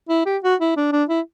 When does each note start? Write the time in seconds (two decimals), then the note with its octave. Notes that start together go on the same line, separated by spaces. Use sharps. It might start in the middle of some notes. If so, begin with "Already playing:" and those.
0.09 E4
0.26 G4
0.43 F#4
0.60 E4
0.77 D4
0.92 D4
1.09 E4